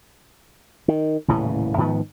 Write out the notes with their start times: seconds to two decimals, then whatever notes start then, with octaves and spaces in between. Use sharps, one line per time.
0.88 D#3
1.28 D#1 A2 C#3 E3
1.78 G#2 D#3 F3 B3